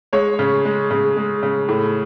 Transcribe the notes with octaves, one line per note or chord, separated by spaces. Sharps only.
G#3 C#5
C#3
G#3
C#3
G#3
C#3
A2